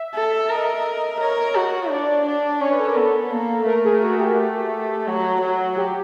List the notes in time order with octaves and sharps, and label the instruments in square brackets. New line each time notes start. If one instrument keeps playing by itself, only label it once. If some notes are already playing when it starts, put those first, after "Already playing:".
Already playing: [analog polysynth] E5
[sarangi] A4
[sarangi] A#4 [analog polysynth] D#5
[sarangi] A#4 [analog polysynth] C#5
[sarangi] F#4
[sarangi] D4 [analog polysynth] D5
[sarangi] D4
[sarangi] C#4 [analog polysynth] C#5
[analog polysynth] B4
A4
A#4
[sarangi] B3 [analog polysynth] A4
[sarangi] A#3
[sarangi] A3 [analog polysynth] A#4
[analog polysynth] G#4
F#4
G4
[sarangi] A3
[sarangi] F#3 [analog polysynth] F#4
[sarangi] F#3
[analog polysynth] G4